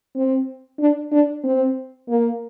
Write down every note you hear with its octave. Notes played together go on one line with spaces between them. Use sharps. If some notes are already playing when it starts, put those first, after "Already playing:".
C4
D4
D4
C4
A#3